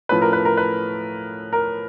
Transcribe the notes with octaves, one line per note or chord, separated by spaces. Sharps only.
A2 F3 A3 C#4 B4
A#4
B4
A#4
B4
A#4